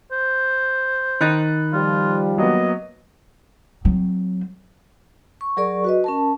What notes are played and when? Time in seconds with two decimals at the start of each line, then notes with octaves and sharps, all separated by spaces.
0.12 C5
1.21 D#3 D#4 B5 F#6 A6
1.73 F3 G3 F4
2.38 F#3 A#3 B3 D#5
3.85 F#3 C4
5.41 C#6
5.57 F#3 G#4 A#4 D5 C#6
5.84 F#4 B4 D#5
6.04 C#4 A#4 A5